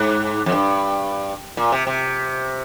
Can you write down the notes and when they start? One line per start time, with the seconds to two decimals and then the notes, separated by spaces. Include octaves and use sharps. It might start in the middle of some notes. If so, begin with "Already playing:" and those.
Already playing: G#2
0.46 F2
0.52 G2
1.57 A#2
1.72 C3
1.87 C3